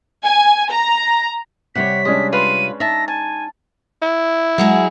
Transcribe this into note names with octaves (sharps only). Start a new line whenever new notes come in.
G#5
A#5
C3 G3 C#5 F#5 B6
G#3 C#4 D4 D#5
F4 B4 C6 D#7
D#4 E5 A5 A#6
G#5 A5
E4
F#3 G#3 G#4